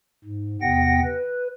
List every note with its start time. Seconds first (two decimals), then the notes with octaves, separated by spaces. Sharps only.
0.25 G#2
0.62 E2 C3 B3 F#5 G5 A#6
1.04 B4